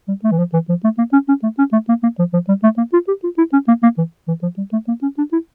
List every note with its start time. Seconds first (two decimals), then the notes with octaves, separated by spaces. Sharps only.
0.08 G3
0.24 A3
0.32 E3
0.39 F3
0.53 E3
0.69 F3
0.84 A3
0.98 A#3
1.13 C#4
1.28 C#4
1.43 A3
1.59 C#4
1.73 A3
1.89 A#3
2.03 A#3
2.19 F3
2.34 F3
2.48 G3
2.63 A3
2.78 A#3
2.93 F4
3.08 G4
3.24 F4
3.38 E4
3.53 C#4
3.68 A#3
3.83 A#3
3.98 E3
4.28 E3
4.43 F3
4.58 G3
4.73 A3
4.88 A#3
5.02 C#4
5.18 D4
5.33 E4